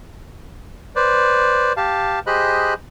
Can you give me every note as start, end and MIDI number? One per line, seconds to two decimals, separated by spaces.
0.96 1.73 71
0.96 1.73 72
0.96 1.73 74
1.77 2.19 67
1.77 2.19 77
1.77 2.19 81
2.27 2.74 67
2.27 2.74 68
2.27 2.74 72
2.27 2.74 75
2.27 2.74 83
2.27 2.74 90